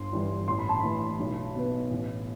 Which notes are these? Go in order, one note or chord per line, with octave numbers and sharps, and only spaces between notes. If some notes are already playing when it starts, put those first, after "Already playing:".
Already playing: G1 C6
G2 E3 G3 D4
A1 C6
B5
A5
A2 E3 B5
B1
B2 B3
A1